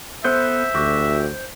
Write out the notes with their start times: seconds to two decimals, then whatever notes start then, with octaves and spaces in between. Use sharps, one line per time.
0.24 B3 A4 B4 C5 E5 G6
0.75 D2 F#4 G4